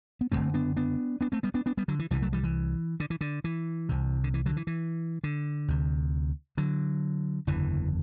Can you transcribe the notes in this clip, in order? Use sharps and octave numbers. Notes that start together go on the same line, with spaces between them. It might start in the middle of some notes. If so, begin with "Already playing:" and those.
B3
F#1 F#2 D3 A3 C4
B3 D4
B3 D4
B3 D4
A3 C4
G3 B3
B3 D4
B3 D4
G3 B3
D3 F#3
E3
C2 C3 E3 G3
F#3 A3
E3 G3
E3
D3
E3
D3
E3
C2 C3
D3
E3
D3 F#3
E3
E3
D3
D2 C3
D3 F#3
F#1 E2 D3 E3